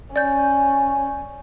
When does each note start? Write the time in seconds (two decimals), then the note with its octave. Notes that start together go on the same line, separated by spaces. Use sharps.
0.16 C#4 D5 G6